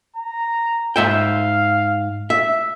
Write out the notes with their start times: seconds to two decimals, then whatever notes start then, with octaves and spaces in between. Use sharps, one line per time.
0.16 A#5
0.96 G#2 E5 F5 G5
2.30 E5